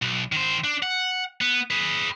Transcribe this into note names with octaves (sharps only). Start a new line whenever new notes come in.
B1
D#3 C5
D4
F#5
B3
G#4 B4